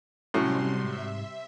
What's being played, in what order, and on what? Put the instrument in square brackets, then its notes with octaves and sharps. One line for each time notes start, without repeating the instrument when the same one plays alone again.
[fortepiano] A2 F#3 [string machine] C3 G3 C6 [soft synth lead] C#4
[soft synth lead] G#2 [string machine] E5